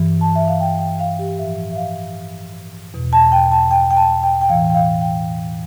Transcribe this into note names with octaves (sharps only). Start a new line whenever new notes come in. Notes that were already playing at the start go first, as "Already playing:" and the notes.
Already playing: G2 E3
A5
E5
F5
G5
G5
F5
G4
A2 F3 E5
E5
F5
E2 B2
A5
G5
A5
G5
G5
A5
G5
G5
A2 E3 F5
G5
F5
G5